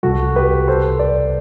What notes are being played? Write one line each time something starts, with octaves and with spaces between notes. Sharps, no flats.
C2 C3 G3 F#4 A4
G4 B4
A4 C5
B4 D5